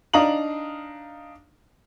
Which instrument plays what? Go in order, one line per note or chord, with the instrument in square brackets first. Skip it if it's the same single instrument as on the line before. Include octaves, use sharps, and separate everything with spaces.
[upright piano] D4 D#4 F5 A#5 D#6 F#7